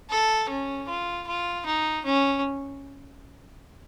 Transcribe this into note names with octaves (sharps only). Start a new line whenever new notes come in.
A4
C#4
F4
F4
D#4
C#4